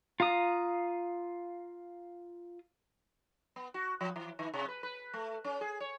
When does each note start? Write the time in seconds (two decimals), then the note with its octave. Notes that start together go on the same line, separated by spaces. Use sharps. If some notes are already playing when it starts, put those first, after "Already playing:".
0.20 F4 F5 A#5 D#6
3.56 B3
3.74 F#4
4.01 F3
4.16 E3
4.39 D#3
4.54 C3
4.68 B4
4.83 B4
5.14 A3
5.44 C#4
5.61 G#4
5.80 C#5